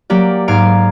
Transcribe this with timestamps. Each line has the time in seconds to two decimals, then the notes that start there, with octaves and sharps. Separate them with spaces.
0.10 F#3 A#3 G4 D5
0.48 G#2 F5 A#5 G#6 D7